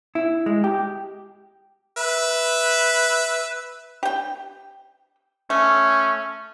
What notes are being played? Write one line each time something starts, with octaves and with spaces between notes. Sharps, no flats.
E4
G#3
G4
B4 E5
G4 G5
A3 C#4